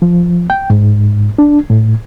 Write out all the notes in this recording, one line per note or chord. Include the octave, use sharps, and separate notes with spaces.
F3
G5
G#2
D4
A2